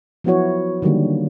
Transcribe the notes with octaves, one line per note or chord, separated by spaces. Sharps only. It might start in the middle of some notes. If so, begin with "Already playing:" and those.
F3 F#3 B3 E4 F#4 C#5
D3 D#3 F#3 G3 A#3